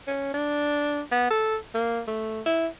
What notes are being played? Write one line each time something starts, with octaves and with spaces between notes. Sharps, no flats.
C#4
D4
B3
A4
A#3
A3
E4